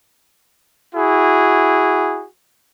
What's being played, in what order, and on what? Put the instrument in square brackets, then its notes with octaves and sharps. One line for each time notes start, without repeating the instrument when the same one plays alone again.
[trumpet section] E4 F#4 G#4